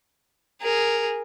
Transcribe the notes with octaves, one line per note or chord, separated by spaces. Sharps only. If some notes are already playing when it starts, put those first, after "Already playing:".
G#4 A#4